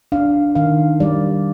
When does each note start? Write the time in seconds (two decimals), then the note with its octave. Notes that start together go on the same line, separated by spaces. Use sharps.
0.12 D4 F5
0.55 D#3 F5
1.00 G3 D5